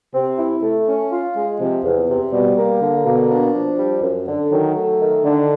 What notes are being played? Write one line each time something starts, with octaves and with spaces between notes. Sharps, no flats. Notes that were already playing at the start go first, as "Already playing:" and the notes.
C3 C4
E4
A3
C#4
F4
G#3
C3 F3
E2
C3
B2 G3
A#3
D3
B2 A#3
D4
F3
G3
F#2
D3
D#3 F#3
A3
D#3
D3 D4